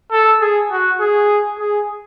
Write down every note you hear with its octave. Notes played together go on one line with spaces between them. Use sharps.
A4
G#4
F#4
G#4
G#4